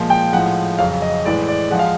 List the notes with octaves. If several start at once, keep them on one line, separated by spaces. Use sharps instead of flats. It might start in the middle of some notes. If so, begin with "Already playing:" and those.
Already playing: A#2 F3 G#3
G5
A2 F3 G#3 F#5
F2 C#3 F#3 F5
D#5
A2 E3 G#3 D5
D5
F3 G#3 F#5
F5